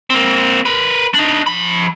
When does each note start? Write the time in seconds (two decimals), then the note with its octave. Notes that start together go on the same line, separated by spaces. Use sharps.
0.10 A#3 C4
0.66 A#4 B4
1.14 D4 D#4
1.47 F3 B5